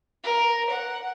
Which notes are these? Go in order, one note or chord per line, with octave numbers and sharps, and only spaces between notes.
A#4
F#5